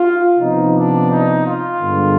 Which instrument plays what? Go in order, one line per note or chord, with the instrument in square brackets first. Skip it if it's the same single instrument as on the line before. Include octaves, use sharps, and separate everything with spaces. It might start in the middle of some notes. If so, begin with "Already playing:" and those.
Already playing: [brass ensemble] F4
C3 F3 B3 D#4
D4
D#4
F4
G2 D3 G#3 B3